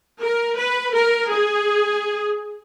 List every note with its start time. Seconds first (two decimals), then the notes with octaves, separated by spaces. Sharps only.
0.22 A#4
0.58 B4
0.94 A#4
1.30 G#4